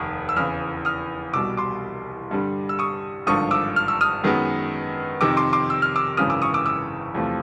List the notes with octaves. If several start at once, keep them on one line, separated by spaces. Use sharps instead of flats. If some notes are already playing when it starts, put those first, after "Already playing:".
Already playing: F1 D#2 B5 C#6 D#6
E6
E2 C#3 E3 D#6 F6
D#6 F6
C2 B2 G3 D6 E6
C6 D6
G2 D3 G3
E6
C#6 D#6
G#1 G2 D3 F3 C#6 D#6
D6 E6
F6
E6
D#6 F6
F#2 D#3 G#3 B3
F2 C3 D#3 D6 E6
C6 D6
C6 D6
E6
F6
D6 E6
G#1 F#2 C#3 E3 D#6 F6
D6 E6
C#6 D#6
D6 E6
D6 E6
E2 C3 F3 A3